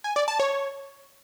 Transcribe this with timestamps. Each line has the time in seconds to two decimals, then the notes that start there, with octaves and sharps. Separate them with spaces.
0.04 G#5
0.16 D5
0.28 A5
0.40 C#5